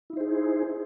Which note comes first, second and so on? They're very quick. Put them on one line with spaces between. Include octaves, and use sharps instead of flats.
E4 D#4 C5 G#4